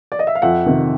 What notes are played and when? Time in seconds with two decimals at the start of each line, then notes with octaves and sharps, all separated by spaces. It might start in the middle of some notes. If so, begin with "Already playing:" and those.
0.12 D5
0.19 D#5
0.27 E5
0.35 F5
0.42 F2 E5 F#5
0.66 C3 D#3